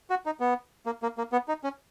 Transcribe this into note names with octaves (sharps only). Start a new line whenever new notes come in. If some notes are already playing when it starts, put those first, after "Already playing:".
F#4
D#4
B3
A#3
A#3
A#3
B3
D#4
C#4